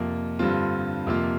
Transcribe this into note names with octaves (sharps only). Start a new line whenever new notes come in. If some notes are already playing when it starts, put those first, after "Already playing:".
Already playing: F2 C3 A#3 F4
G2 D3 G3 C4 F4
F2 C3 A#3 F4